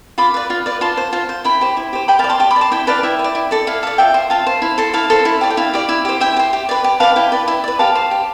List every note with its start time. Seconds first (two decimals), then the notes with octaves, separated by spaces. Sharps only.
0.18 F4 B5 D6
0.34 B4 D5
0.50 F4
0.66 B4 D5
0.81 F4 A5 C6
0.97 C5
1.13 F4
1.29 C5
1.45 E4 G5 B5
1.61 G4 C5
1.77 E4
1.93 G4 C5
2.08 G4 G5 B5
2.19 F5 A5
2.24 D5
2.29 A5 C6
2.40 G4 A5 C6
2.51 B5 D6
2.56 D5
2.61 A5 C6
2.72 E4 G5 B5
2.87 B4 D5 F5 A5
3.03 E4 E5 G5
3.19 B4
3.24 D5
3.35 E4
3.51 A4 D5
3.67 E4 F5
3.83 A4 D5 F5
3.98 F4 E5 G5
4.14 C5
4.30 F4 F5 A5
4.47 C5
4.62 E4
4.78 A4 C5
4.94 E4 F5 A5
5.10 A4 C5
5.25 E4
5.41 G4 D5
5.50 G5
5.57 E4 F5
5.73 G4 D5
5.89 E4
6.05 G4 C5
6.20 E4 E5 G5
6.36 G4
6.39 C5
6.53 G4
6.69 B4 D5
6.84 G4
7.00 B4 D5 F5 A5
7.16 E4 G5 B5
7.32 B4 D5
7.48 E4
7.64 B4 D5
7.79 G4 F5 A5
7.95 C5
8.11 G4